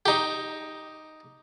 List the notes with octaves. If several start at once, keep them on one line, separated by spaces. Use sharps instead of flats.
D#4 G4